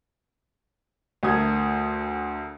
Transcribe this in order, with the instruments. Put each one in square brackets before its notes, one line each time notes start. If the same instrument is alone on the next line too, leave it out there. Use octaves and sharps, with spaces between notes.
[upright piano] D2 A3 A#4 D#6 G#6